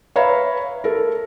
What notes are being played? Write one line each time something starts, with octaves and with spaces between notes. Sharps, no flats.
B4 C#5 E5 F5 A#5 B5
A4 A#4